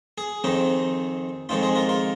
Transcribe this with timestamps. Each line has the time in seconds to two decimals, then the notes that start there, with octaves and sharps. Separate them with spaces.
0.18 G#4
0.44 F2 D#3 C4 D#4
1.49 F2 D#3 G#3 C4 D#4 F4
1.63 G#4
1.76 F4 A#4
1.89 F4 A#4